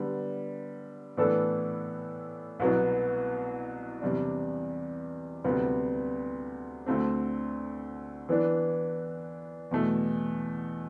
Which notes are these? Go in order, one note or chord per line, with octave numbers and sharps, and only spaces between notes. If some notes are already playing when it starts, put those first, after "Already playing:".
Already playing: D3 G3 B3
A2 E3 B3 D4 A4
C2 B2 F#3 B3 E4
E2 C3 G3 D4
D2 C3 G3 B3
D2 D3 A3 C4
E3 B3 D4
E2 B2 A3